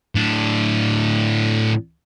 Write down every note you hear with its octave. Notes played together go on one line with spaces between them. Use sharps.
A2 D4